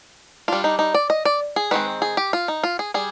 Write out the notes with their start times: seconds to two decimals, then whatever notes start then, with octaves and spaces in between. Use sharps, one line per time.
0.48 G3 D4 F4
0.64 D#4
0.79 D#4
0.94 D5
1.10 D#5
1.25 D5
1.56 G#4
1.71 D#3 G#3 C4 B4
2.02 G#4
2.17 G4
2.33 F4
2.48 D#4
2.64 F4
2.79 G#4
2.94 G3 G#4